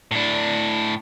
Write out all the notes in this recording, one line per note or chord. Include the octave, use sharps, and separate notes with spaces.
A2 D4